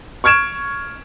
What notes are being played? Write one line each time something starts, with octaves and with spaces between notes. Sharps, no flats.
C#6 F6 G#6 D7 E7